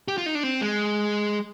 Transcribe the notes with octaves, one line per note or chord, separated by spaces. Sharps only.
G4
F4
D#4
D4
C4
G#3